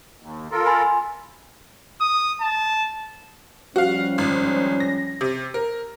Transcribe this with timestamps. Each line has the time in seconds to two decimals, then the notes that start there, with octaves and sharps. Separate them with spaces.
0.20 D#2
0.51 F4 A4 A#4
0.66 G#5 B5 C6
2.01 D#6
2.41 A5
3.76 F3 G3 C#4 F#4 F5
4.18 G#1
4.80 A#6
5.21 C3
5.54 A#4